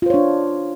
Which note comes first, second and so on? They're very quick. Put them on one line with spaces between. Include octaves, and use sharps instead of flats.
F4 C5 C#5 D4